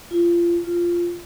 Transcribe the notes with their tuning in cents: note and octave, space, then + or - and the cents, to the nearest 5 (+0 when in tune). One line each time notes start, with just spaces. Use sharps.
F4 -25
F4 -10